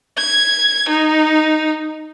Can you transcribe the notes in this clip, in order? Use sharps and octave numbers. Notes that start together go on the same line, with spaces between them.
G#6
D#4